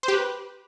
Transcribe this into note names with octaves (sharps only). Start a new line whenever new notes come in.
C5
G4
B4